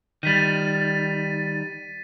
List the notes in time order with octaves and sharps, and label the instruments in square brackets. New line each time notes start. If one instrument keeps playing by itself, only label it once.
[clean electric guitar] D#3 G3 [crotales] A6 B6 D#7